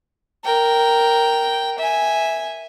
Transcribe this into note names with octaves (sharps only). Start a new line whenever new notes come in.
A#4 G5
E5 G#5